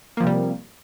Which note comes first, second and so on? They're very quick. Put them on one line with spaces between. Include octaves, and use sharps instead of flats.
A#3 F3 C3 G3